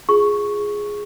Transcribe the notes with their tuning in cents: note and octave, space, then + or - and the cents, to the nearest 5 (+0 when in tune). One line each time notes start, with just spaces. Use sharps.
F4 +0 G#4 +0 C#6 +0